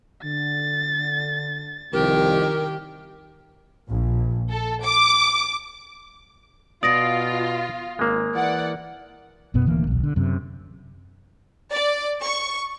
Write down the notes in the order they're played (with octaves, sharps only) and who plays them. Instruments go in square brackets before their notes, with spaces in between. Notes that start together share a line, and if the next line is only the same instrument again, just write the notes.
[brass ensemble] D3 [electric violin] A6
[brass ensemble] C2 F2 [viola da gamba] D#3 G4 [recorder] A#4
[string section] A#1
A4
D6
[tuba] B2 [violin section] F4 [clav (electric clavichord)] D5 [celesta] D#6 A#6 D7
[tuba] G#1 [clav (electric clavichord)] G#3 A#3
[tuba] E3 [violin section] D5 F#5
[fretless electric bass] F#1 F#2 B2 B3
D1 D2 E3 A#3
D#1 B1
D3
F#2 C3
[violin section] D5
C#6